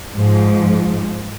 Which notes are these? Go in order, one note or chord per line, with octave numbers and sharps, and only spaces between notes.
G#2 F3